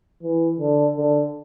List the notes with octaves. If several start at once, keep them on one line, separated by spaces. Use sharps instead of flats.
E3
D3
D3